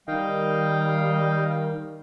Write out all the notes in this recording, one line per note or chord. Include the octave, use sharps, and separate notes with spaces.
D#3 G3 D#5 F5 G5